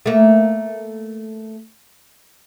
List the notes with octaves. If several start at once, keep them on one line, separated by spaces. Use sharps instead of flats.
A3 A#3